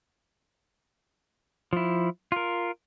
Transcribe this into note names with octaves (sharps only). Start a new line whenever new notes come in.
F3 E4
F4 A#4